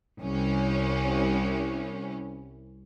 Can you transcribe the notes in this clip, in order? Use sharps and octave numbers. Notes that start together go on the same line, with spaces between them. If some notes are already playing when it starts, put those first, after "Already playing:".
C2 C#4